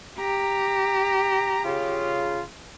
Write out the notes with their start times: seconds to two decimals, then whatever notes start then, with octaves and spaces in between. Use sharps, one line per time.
0.18 G4 A#5
1.64 C#3 F4